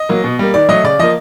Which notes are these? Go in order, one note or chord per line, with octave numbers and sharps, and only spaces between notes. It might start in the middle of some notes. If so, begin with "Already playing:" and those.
Already playing: D#5
F#3 A#3
B2
G3 A#3
D#3 D5
F#3 A3 D#5
C#3 D5
F3 A#3 D#5